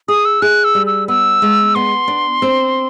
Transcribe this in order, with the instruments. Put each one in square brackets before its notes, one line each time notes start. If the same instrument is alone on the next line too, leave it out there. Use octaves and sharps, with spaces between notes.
[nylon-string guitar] G#4 [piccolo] D#6
[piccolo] E6
[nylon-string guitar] G#4 [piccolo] F#6
[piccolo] E6
[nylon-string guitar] G3
[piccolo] E6
[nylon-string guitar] B3 [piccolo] E6
[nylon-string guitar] G#3
[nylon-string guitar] B3 [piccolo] C6
[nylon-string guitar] D4
C4